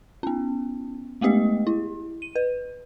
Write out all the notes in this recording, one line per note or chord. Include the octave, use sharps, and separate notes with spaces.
B3 C#4
G#3 A3 B3 G4 D#5
E4
D#7
B4